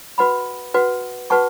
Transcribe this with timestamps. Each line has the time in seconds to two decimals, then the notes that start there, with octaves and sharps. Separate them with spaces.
0.18 F#4 B4 F#5 B5
0.74 F#4 B4 F#5
1.30 F#4 B4 F#5 A5 C#6